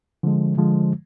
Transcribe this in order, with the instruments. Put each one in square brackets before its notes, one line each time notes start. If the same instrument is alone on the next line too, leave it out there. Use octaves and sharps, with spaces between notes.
[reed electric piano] D3 F3 G#3
D3 F3 G#3